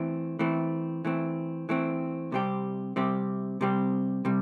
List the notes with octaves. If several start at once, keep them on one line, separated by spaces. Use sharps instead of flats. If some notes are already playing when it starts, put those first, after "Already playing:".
Already playing: E3 A3 C4
E3 A3 C4
E3 A3 C4
E3 A3 C4
C3 G3 C4 G4
C3 G3 C4 G4
C3 G3 C4 G4
C3 G3